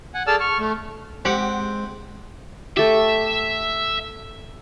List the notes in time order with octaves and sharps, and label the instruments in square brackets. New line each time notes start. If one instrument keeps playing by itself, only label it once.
[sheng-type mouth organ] F#5 G#5
G#4 A4 D5 A5 E6 F6
C#6 F6
A3
[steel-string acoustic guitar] G#3 [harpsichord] C4 [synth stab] G4 F#5 F#6
[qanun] A3 G4 [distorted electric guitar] E5